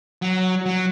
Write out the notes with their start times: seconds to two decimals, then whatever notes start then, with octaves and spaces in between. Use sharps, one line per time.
0.22 F#3
0.66 F#3